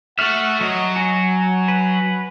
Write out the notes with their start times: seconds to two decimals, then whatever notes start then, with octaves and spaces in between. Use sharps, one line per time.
0.19 A3 F#4 A4 E5 F#5 F6
0.61 F#3 D#5
0.96 F#4 G#5
1.68 B4